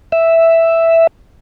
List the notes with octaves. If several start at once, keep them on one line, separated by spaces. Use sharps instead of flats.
E5